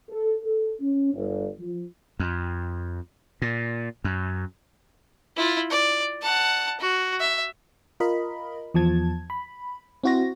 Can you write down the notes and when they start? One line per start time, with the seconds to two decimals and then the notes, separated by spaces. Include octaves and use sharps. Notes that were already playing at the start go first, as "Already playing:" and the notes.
0.10 A4
0.43 A4
0.81 C#4
1.14 G1
1.60 F3
2.20 F2
3.42 A#2
4.04 F#2
5.37 E4 F4
5.71 D5
6.22 F#5 A5
6.80 F#4
7.20 E5
8.00 F4 A#4 D#5 B5
8.74 E2 F3 A5 G#6
9.30 B5
10.04 C4 E4 F#4 C5 A#6